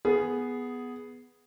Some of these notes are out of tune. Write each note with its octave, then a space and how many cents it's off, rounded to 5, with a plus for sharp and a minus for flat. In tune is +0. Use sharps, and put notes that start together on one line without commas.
B3 +0 G#4 +0